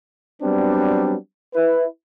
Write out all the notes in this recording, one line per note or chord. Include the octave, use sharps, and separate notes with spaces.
F#3 G3 B3 C4 D4
E4 B4